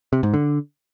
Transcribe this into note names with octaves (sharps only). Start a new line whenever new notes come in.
C3
G#2
D3